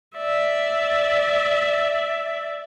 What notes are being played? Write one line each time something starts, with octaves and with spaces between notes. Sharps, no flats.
D5 E5